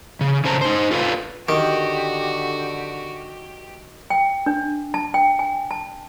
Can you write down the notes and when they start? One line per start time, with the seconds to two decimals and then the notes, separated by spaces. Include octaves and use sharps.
0.21 C#3
0.45 C#3 C#4 A4 C5 A5 A#5
0.61 D#4 C5
0.91 F4 A4 B4 F5
1.49 D3 D#3 F#4 G4
4.10 G5
4.46 D4
4.94 A5
5.14 G5
5.39 G#5
5.71 A5